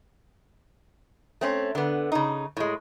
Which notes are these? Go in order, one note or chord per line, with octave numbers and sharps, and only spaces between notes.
A3 C4 C#4
D3 B3
C#3 D#4
A2 G#3